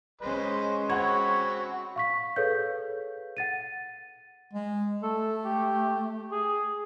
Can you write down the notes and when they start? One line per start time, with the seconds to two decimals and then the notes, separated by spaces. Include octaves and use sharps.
0.21 G#3 C#4 B4 C5 D#5
0.90 C4 F#4 C#5 F#5 B5
1.96 F5 C#6 B6
2.36 G#4 A4 B4 C#5 F5 G6
3.37 F#5 A6 D#7
4.53 G#3
5.03 A3 A4
5.45 G4
6.32 G#4